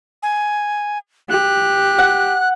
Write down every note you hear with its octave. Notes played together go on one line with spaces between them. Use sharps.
G#5
G4 F#6
F#5